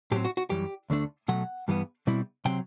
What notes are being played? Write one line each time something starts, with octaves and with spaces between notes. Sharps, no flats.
A2 F#3 C4 G4
F#4
F#4
F#2 E3 G3 G4
D2 D3 A3 D4
B2 F#3 A3 F#5
G2 E3 G3 B3
B2 G3 C4 E4
C3 F#3 C4 G5